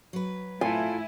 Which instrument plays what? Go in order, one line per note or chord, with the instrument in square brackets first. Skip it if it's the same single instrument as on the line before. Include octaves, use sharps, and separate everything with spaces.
[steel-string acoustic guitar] F#3 B4
[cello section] A2 E4 [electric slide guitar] F4 A4 [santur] G#5